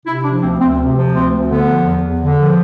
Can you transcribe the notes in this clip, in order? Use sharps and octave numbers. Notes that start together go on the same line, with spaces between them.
C3 E4
F3 D4
D2 C4
D2 C4
C3
F3
D2 C4
D2
D3 B3
F3
E2
E2
D3
F3